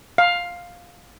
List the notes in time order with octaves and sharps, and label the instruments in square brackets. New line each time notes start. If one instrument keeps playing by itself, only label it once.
[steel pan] F5